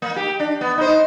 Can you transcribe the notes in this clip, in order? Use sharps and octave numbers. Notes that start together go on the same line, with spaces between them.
A#3
G4
D4
B3
D#4 C5